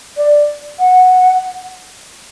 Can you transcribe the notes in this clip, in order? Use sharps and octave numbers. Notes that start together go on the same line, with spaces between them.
D5
F#5